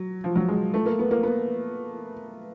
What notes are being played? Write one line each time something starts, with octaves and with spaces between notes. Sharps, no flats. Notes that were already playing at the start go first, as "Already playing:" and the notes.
Already playing: F#3
F3
F#3
G#3
A3
A#3
B3
A#3
B3